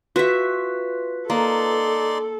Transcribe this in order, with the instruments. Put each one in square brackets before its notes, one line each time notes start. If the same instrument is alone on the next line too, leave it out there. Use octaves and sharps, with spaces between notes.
[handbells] F4 B4 B6 [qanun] F#4 E5
[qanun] A#3 [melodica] D#4 D5 C6 [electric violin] A4